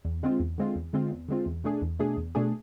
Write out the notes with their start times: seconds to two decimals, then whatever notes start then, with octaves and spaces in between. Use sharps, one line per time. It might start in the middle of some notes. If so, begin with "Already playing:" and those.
0.05 E2
0.23 D3 G#3 C4 F4
0.40 E2
0.58 D3 G#3 C4 F4
0.76 E2
0.93 D3 G#3 C4 F4
1.11 E2
1.29 D3 G#3 C4 F4
1.46 E2
1.64 B2 A3 D4 G#4
1.82 E2
1.99 B2 A3 D4 G#4
2.17 E2
2.35 B2 A3 D4 G#4